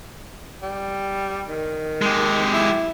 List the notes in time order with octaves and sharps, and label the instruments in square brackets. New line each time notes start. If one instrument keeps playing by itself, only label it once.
[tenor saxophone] G3
D#3
[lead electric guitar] G#3 G4
[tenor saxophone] E4